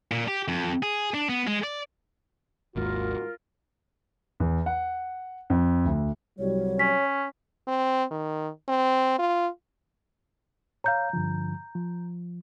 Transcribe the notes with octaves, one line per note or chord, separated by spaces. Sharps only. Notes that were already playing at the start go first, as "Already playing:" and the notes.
A#2
G4
F2
G#4
D4
B3
G#3
D5
G#1 D#2 G#2 F4 F#4 A#4
E2
F#5
F2
D2
C2 F#3 G3 C#5
C#4 B6
C4
D#3
C4
F4
C#5 F5 A#5 G6
G2 D3 F3
F3